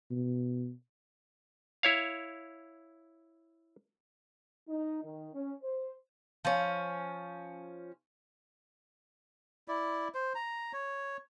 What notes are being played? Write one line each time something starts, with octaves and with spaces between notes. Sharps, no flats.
B2
E4 C#5 F5
D#4
D#3
C#4
C5
F3 C#4
E4 D5
C5
A#5
C#5